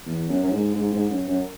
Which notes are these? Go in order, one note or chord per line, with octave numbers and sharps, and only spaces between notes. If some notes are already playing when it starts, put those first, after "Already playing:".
E2
F#2
F#2
G#2
G#2
G#2
F#2
F#2